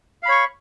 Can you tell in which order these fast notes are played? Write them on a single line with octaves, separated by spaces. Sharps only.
F5 B5 C#5 C#6